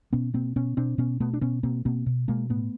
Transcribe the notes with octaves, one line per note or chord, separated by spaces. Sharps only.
B2 B3 C#4
B2 A#3 C4
B2 B3 C#4
B2 C4 D4
B2 B3 C#4
B2 A3 B3
D4
B2 B3 C#4
B2 A#3 C4
B2 A#3 C4
B2
B2 G#3 A#3
A2 A3 B3